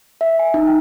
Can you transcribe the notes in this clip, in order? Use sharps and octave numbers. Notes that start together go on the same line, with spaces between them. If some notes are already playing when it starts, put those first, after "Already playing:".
E5
G#5
D#4
G5